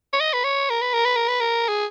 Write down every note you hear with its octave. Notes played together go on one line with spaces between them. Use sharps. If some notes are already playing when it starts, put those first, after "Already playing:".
C#5
D#5
B4
C#5
A#4
B4
A#4
B4
A#4
B4
A#4
G#4